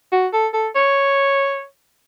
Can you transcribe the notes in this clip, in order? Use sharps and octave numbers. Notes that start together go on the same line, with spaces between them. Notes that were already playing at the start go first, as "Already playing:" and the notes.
F#4
A4
A4
C#5